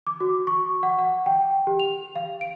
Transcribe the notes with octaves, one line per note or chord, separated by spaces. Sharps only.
D6
F#4
C#6
F#5
F#5
G5
G4
F7
F5
D7